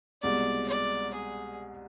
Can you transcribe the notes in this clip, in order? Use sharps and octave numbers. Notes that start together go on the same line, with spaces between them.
C2 B2 G#3 D5
D5
G#4